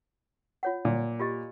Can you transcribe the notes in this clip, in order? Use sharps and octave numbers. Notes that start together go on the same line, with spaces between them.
F4 C#5 F#5
A#2
F4 G4 D#5